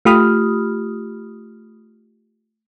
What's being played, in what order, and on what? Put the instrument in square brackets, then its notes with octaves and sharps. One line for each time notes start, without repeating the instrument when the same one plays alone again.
[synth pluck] A3 F4 G4 B5 D#6 F6